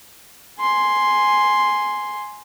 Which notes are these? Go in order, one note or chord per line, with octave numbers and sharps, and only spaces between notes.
G#5 C6